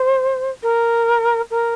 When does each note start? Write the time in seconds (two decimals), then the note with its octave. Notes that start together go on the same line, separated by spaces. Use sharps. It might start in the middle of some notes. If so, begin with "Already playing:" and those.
Already playing: C5
0.62 A#4
1.50 A#4